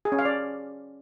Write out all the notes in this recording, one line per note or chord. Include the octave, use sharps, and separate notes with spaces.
G#4
C#4
F5
D5